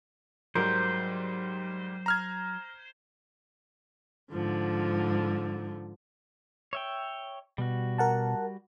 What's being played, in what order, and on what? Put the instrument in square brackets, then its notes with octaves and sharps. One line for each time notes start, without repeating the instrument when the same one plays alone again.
[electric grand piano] G#2 G3 [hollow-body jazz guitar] F#3 A#4 [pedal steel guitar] C5
[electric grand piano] A#5 F6 G#6
[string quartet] G#2 D3 F3
[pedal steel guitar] C#5 E5 G5
[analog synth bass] B2 [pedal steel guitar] G3 F#4
[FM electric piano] A#4 F#5 A5